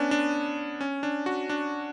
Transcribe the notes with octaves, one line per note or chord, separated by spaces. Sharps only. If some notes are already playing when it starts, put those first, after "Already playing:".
Already playing: B3 C#4 D4
D4
C#4
D4
F#4
D4